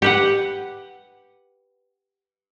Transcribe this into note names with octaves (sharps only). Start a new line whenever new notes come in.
G4 B4 F#5